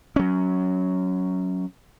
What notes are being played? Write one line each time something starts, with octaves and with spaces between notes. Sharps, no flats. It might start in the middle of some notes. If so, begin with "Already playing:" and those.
F#3 C#4